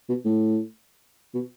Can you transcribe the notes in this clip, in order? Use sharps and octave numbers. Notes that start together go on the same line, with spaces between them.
B2
A2
B2